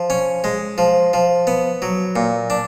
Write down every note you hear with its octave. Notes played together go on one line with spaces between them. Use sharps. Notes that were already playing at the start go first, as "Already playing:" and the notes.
Already playing: F3
C#4
G#3
F3
F3
B3
F#3
A#2
D4